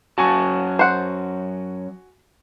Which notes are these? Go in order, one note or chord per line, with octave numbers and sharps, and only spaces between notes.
F#2 C#4 F#4 G#5 A5 C#6
C5 F#5